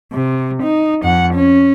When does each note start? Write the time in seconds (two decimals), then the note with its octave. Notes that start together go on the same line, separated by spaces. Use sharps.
0.12 C3
0.63 D#4
1.03 F2 F#5
1.34 C#4